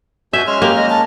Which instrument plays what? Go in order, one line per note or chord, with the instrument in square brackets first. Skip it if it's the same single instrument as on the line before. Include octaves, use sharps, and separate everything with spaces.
[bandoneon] B2 G#5 G6 [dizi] F#4 [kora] E5
[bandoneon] G#3 C#4 F6 [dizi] C6
[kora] A#3 [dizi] G4
[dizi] D#5
A5